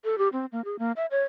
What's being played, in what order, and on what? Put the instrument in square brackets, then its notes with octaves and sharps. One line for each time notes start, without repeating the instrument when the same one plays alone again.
[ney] A4
G4
C4
A#3
G#4
A#3
E5
C#5